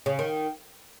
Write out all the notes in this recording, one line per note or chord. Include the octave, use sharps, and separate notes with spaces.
C#3
D#3